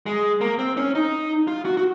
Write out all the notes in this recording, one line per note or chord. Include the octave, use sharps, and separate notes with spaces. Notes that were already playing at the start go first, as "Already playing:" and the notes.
G#3
A#3
C4
C#4
D#4
F4
F#4
F#4